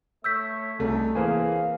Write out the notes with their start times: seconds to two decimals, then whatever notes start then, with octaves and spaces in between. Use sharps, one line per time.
0.24 A3 C#5 E5 E6 G6 B6
0.79 C2 F#2 A3 D4 D#4
1.15 E3 A#3 G#4 A#4 C5 F5 G#5